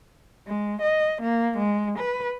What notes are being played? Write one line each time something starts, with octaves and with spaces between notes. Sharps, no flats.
G#3
D#5
A#3
G#3
B4